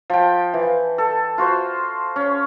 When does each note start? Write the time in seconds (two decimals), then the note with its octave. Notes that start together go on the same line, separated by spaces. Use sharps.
0.10 F3 G5
0.54 E3
0.98 A4
1.38 F4 F#4 C5
2.16 C#4